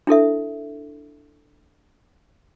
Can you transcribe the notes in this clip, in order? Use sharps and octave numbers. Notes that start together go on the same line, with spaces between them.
D4 E4 A4 E5